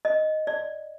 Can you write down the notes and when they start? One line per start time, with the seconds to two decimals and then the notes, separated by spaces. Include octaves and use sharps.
0.05 D#5
0.47 D5